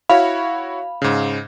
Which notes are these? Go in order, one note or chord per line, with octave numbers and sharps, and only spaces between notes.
E4 F#4 C#5 F5 B5
G#2 C#3